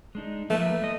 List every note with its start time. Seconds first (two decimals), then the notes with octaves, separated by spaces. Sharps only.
0.15 G#3 D4 D#4
0.50 F3 A3 A#3 B4
0.82 G#3 D#5